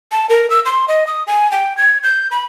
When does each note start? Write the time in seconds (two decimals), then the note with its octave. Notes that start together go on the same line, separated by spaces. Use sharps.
0.12 A5
0.29 A#4
0.50 E6
0.66 C6
0.88 D#5
1.07 D#6
1.27 G#5
1.52 G5
1.77 G#6
2.03 G6
2.31 B5